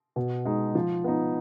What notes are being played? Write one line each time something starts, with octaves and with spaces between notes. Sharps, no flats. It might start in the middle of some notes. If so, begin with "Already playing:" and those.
B2
G#3 D#4
F3
B3 D#4